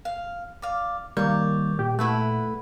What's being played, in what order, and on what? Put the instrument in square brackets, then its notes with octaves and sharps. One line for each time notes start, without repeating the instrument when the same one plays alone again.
[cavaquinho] F5
D5 F5
[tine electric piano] D#3 G3 G6 [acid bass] A#3 [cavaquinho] C#5 D5
[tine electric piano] A#2 [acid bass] G4
[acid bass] A3 [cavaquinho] E4 B4 F#5